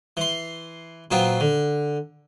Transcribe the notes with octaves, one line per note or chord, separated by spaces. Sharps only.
E3 C6
A#2 F#3 B3 C4 F4
D3